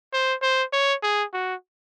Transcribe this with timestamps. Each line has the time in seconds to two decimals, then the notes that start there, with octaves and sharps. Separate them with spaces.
0.13 C5
0.42 C5
0.73 C#5
1.03 G#4
1.33 F#4